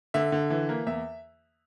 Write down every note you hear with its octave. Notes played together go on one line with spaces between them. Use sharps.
D3 E5
D3
E3
A#3
E2 E5